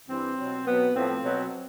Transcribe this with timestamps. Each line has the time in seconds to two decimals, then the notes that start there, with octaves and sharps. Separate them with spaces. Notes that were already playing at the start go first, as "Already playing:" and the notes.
0.09 G2 E3 C4
0.37 B2 F#3
0.65 B2 F#3 B3
0.94 A2 F3 C4
1.22 B2 F#3